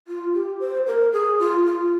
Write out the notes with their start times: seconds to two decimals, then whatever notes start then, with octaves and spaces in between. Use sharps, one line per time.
0.08 F4
0.34 G4
0.60 C5
0.87 A#4
1.12 G#4
1.39 F4
1.66 F4